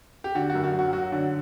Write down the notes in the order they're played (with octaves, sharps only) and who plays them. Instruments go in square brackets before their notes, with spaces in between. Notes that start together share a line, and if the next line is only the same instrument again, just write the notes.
[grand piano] G4
[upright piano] D3 [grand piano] F#4
[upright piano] F#2 [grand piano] F#4
[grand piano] F#4
[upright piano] F#3
[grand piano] F#4
[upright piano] F#3 [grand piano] F#4
[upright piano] D3